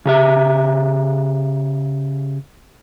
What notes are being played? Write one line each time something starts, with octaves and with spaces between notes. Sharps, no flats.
C#3 G4 E5